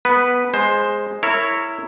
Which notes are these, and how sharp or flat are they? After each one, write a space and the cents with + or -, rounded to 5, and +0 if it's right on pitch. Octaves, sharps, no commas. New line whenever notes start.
B3 +0 B4 +0
G#3 +0 C5 +10
E4 +0 A#4 -25 C#5 +0